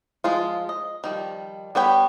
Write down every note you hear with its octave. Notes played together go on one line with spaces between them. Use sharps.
F3 G#3 F4
D#5
D#3 F3 G3
G3 B3 C#5 G5 B5